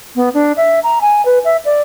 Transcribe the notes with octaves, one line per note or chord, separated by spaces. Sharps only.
B3
D4
E5
A#5
G#5
B4
E5
D5